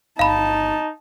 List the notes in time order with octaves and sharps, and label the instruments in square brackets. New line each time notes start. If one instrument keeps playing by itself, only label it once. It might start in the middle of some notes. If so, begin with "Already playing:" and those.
[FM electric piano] G1 [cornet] D#4 [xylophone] F5 B5 [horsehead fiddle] A5